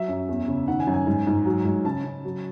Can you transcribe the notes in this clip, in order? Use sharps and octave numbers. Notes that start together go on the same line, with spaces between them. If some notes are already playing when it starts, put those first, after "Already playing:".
Already playing: F#3 E5
F#2
E2
C#3
D#3 F#5
G#5
F#2
G#5
G#2
G#2
F#3
G#2
C#3 A5
C#3
F#3